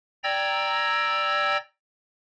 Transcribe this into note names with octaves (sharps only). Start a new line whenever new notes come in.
D5 G5 A#5 E6 G#6 A#6